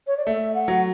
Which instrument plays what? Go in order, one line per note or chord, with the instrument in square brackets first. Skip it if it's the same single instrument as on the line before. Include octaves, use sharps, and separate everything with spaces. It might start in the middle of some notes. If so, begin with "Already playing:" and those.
[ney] C#5
D5
[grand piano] A3 [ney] E5
[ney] F#5
[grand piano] F#3